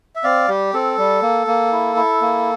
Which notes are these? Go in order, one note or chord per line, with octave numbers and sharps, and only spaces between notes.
E5
C4 D5 F5
G3 G4
C4 A4
G3
A#3
A#3
E4
E4
A#3